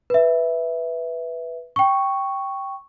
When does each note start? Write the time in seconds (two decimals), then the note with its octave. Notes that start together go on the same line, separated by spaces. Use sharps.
0.10 B4 E5
1.76 G5 C#6